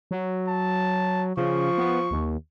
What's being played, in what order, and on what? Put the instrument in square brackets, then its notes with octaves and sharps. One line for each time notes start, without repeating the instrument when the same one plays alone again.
[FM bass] F#3
[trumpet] A5
[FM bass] C#3 [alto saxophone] F3 [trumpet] C#6
[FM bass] B3
D#2